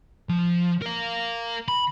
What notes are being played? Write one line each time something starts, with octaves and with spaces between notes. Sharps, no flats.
F3
A#4 F5
B5